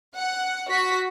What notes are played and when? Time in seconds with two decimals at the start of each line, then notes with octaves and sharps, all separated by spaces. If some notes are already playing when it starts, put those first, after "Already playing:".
0.16 F#5
0.69 F#4 B6